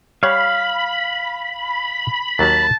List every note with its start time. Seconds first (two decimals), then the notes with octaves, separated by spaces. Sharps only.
0.23 G3 C#5 F5 F#5 B5
2.39 D#2 F#3 A#3 A5